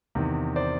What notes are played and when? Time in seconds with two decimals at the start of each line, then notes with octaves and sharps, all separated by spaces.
0.15 E2 C3 D#3
0.56 C5 D5